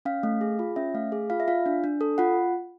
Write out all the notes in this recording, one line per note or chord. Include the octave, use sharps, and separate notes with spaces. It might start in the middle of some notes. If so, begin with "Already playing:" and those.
C#4 F5
A3
G#4
F4
C#4 E5
A3 F5
G#4
F4 F5
E5
F4 F5
D4
D4
A4
F4 F#5